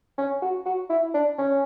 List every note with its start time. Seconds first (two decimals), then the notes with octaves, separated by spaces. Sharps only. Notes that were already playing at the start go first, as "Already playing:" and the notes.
0.18 C#4
0.42 F#4
0.66 F#4
0.90 E4
1.14 D4
1.38 C#4